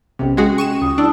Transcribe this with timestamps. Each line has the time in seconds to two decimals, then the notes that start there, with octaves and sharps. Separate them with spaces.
0.19 B1 C3 C#4 G5
0.37 G#3 F#4 G#4
0.58 C#6 D#7 E7
0.82 C#2 D#6
0.98 D4 E4 A5 E6